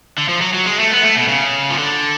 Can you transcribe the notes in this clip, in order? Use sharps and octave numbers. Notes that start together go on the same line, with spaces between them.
D3
F3
F#3
F#3
G#3
A3
B3
A3
B2
C#3
F3
D3